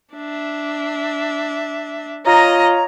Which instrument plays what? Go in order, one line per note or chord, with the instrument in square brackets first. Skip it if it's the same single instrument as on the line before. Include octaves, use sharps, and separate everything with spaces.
[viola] D4 E5
[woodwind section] F4 C#5 A#5 [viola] D#5